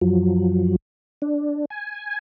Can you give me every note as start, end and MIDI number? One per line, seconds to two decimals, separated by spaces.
0.01 0.76 42
0.01 0.76 53
0.01 0.76 54
1.22 1.65 62
1.70 2.19 80